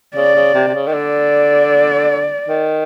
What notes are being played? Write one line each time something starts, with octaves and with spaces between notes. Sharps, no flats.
C#3 D5
C#3
C3
C3
C#3
D#3
D3 D5
D#3